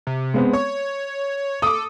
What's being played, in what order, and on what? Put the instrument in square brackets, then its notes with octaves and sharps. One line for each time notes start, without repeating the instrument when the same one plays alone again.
[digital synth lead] C3
[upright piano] G#3 B3 C4
[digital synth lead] C#5 [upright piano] C#6
[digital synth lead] A4 [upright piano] D6 D#6